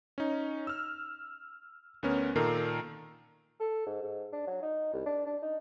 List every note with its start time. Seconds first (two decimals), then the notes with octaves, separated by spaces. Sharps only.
0.18 C#4 D#4
0.67 E6 F6
2.03 D2 B3 C#4 A#4
2.35 A#2 D#3 A4 A#4 C7
3.60 A4
3.86 G#2
4.02 G#2
4.32 D4
4.47 F#3
4.62 D#4
4.93 C2
5.06 D4
5.26 D4
5.42 D#4